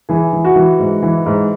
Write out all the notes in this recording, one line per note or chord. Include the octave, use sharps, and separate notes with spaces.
E3 G#4
E3
F#4
E3
G#2
E3
G#2